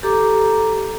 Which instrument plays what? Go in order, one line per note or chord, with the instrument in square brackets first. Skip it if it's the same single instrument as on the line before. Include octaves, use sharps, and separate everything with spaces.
[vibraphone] G4 A4 A#5 D6